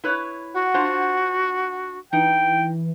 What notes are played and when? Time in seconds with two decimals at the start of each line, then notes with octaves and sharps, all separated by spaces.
0.04 E4 B4 C#5
0.54 F#4 F#5
0.74 D4 F4 C5
2.13 E3 D#4 G5